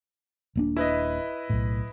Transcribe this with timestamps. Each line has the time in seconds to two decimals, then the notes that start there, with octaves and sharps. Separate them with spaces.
0.55 D#1 A#3 D4
0.77 E4 B4 D#5
1.50 B1 A2